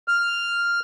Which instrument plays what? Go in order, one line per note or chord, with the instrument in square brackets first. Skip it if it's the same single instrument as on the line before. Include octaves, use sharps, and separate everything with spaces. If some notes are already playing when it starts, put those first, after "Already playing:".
[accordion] F6